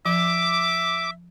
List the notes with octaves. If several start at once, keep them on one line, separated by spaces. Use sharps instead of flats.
F3 E5 D6